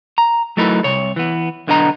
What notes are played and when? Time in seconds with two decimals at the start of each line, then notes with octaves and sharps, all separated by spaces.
0.18 A#5
0.57 F#3 A3 D#4 E4 A#4 B4
0.84 C2 C3 C#5
1.16 E3 B3
1.67 B1 D3 B3 D4 D#5 A#5